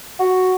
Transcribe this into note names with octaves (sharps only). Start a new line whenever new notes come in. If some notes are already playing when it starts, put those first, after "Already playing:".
F#4